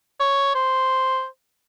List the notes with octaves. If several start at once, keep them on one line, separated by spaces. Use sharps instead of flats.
C#5
C5